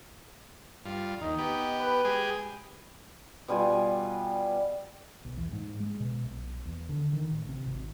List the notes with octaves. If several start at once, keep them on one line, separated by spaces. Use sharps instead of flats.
G2 F4
D#2 D#4
B3 G4
B4
G#3 G4 G#4
B2 G3 F4 G#5
B1
E2
G#2
G#3
B2
B1
E2
D3
D#3
A1
C3
G#1